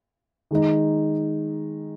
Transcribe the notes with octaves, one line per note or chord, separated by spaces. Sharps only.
D#3 G#3 D#4